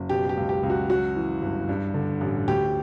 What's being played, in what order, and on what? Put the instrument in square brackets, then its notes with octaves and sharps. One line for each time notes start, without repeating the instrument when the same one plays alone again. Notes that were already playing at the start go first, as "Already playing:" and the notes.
Already playing: [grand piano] F#1
B2 G4
G4
C#2
G4
C#2
F#4
F#2 F#4
E3
G1
G2
D3
A1
D2 G4